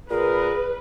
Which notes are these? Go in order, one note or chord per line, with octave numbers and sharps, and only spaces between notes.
A#2 G#4 A#4 B4